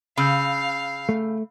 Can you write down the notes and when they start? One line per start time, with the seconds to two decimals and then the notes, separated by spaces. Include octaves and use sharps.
0.17 C#3 F5 B5 E6 G6
1.09 A3